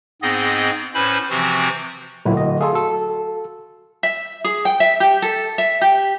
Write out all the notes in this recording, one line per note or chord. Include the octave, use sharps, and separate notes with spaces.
G#2 B3 C4 G#4 D#5
A2 C#4 B4 C5 B5
C3 E3 F3 C4 F#4
D1 A#2 F#3 E4
D#5
G#4 A4 F5 C6
F#4 A4
E5
G#4
G5
E5
G4
A4
E5
G4